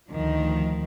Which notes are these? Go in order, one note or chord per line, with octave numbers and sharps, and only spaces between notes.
D2 D#3 F3